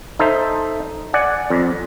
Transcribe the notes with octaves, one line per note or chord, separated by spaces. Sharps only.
D#4 A4 C5 E5
D5 F#5 G#5
F2